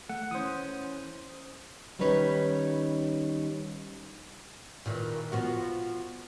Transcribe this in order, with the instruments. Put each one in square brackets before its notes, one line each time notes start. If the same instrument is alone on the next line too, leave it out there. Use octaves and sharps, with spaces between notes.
[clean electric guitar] A3 [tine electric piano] F#5
[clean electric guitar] E3 C#4 [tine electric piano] C5 D#6
[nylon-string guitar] D#3 G3 C#4 D#4 B4 C#5
[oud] A#2 D#3 E3
F3 B3 F#4